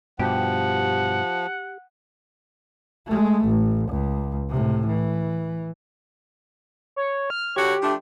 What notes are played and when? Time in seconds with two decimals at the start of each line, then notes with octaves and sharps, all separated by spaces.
0.19 G2 B2 F3 G4 F#5
3.06 G#3 A3
3.45 A1
3.89 C#2
4.50 A2 C3
4.87 E3
6.96 C#5
7.30 F6
7.56 D3 F#4 G4 C#5
7.82 F3 A3 D4